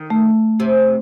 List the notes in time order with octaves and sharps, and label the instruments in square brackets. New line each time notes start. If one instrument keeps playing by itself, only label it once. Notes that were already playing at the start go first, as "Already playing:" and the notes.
Already playing: [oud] D#3
[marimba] A3
[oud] C3